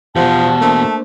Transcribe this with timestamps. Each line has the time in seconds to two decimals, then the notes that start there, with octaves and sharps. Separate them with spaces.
0.16 E2 B2 F3 G4 C5 F#5 A5
0.61 A3 A#3 D4 C5